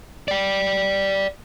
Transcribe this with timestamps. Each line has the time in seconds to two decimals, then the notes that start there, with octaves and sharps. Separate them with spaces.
0.28 D5 G5